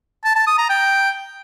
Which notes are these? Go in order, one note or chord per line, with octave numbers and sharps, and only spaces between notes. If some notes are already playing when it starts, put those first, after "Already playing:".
A5
A5
D#6
A#5
G5